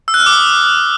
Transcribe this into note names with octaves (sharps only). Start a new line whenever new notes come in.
E6
F#6
F6
D6
D#6